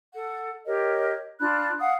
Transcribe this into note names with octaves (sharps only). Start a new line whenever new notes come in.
A4 F#5
G4 A#4 C#5 D#5
D4 F4 B5 F#6
F5 F#5 D#6